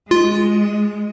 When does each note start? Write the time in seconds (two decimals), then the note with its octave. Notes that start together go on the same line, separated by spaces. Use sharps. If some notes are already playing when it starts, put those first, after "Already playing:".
0.11 G#3 F4